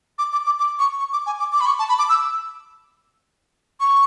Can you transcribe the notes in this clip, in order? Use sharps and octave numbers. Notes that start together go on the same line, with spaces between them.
D6
D6
D6
D6
C#6
C#6
D6
G#5
D6
D6
B5
C#6
A5
B5
D6
E6
C#6